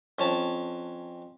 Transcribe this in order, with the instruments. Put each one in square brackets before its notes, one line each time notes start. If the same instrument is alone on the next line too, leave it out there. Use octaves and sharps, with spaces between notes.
[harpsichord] F2 C#4 C#5 A5